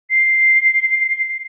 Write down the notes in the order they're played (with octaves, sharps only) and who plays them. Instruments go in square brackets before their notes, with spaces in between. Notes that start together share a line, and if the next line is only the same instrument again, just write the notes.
[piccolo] C7